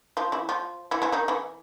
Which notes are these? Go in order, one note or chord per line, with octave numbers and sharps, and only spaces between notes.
F3 F4
E3 E4
F3 F4
E3 E4
E3 E4
D#3 D#4
E3 E4